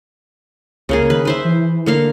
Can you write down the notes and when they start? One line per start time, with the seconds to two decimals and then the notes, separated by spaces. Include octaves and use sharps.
0.89 C#2 C#3 A#3 G#4
1.10 D#3 B4
1.25 B4 C5 E5
1.45 E3
1.86 D3 A#3 F5